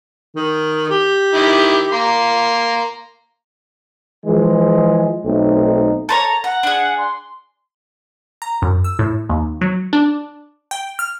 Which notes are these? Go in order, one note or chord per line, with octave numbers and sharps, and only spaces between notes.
D#3
G4
D#3 E4
A#3 A#5 C6
E3 F3 G#3
B1 A3 C4 D#4
A4 C5 C#5 A#5
F#5 A#5
D4 G#4
C6
A#5
F#2
E6
A2
D#2
F#3
D4
G5
F6